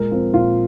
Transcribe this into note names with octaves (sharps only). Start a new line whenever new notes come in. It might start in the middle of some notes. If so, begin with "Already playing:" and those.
Already playing: A#2 G#3 A#4
F3 C4
A#2 F4